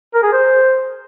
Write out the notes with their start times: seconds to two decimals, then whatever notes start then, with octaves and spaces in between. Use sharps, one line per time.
0.14 A#4
0.23 G#4
0.33 C5